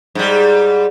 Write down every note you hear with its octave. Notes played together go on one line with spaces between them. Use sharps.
G#2 G3